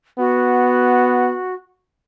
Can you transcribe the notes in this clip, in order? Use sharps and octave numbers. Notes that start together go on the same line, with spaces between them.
B3 F#4